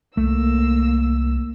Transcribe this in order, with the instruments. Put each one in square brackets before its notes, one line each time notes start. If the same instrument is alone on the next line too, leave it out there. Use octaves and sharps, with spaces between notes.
[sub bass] C2 [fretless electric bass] A3 [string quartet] A#3 E6